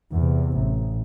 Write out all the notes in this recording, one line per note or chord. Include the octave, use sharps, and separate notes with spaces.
E2 C3
A1